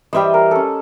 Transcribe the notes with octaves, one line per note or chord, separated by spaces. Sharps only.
E3 G3 C5 D#5 E5 G5
A#4
C#4 A4